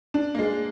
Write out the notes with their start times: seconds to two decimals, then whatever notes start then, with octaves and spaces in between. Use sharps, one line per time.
0.14 D4
0.35 A#3
0.39 G#3